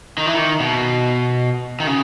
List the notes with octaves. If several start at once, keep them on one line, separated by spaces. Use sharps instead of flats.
D#3
E3
D#3
B2
D#3
C#3